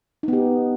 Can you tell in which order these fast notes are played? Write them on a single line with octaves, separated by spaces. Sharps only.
D#4 B3 G4